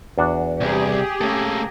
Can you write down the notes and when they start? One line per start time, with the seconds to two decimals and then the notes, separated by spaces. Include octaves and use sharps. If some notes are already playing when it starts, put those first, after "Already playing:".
0.18 E2 D4 F#4
0.61 C2 G4 G#4
1.21 A3 A#3 C#4 A4